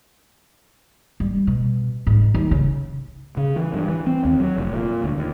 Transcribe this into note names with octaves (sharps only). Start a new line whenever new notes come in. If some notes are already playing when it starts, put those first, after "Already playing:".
G3
B2
G#2
D#2
C#3
C#3
E3
G2
E3
C4
D#2
F#3
F1
A#2
D2
D#2